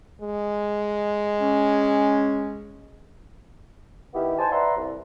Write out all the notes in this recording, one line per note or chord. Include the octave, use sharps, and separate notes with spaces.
G#3
C#4
D#3 B3 E4 G4
D#4 C5 G#5 A5
B4 D5 E5 F#5 A#5 C6
C2